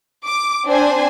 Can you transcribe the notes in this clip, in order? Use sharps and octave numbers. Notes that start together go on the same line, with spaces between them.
D6
C4 D4 C5 G#5